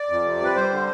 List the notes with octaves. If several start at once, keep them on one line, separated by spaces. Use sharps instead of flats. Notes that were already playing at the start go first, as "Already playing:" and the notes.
Already playing: D5
F2
C3
G3 B4
G3 C5
D3